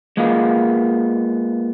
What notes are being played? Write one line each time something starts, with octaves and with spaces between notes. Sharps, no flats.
G#3 A#3 B3 F4